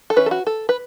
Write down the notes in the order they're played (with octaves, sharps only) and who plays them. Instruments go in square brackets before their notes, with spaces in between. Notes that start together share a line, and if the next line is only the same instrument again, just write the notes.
[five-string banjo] A4
E3 C#4 E4 B4
A4
F#4
A4
B4